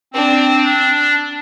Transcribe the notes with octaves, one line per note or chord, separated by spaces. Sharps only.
C4 D4
D4